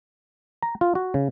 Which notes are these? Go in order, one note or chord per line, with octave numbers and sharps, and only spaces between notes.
A#5
F4
F#4
C#3